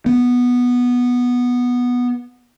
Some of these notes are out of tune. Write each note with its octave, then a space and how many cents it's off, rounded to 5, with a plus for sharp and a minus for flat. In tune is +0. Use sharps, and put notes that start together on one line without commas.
B3 -5